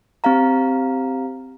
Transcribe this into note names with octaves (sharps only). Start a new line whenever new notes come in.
C4 G4 F5 A#5